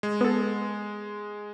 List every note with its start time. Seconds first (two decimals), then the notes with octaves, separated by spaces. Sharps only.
0.03 G#3
0.21 B3 A4